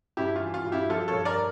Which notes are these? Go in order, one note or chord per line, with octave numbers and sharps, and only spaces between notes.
G2 E4 G4
F4
E3
F4
G2
E4 G4
F3 F4 A4
A4 C#5
G2
A#4 D5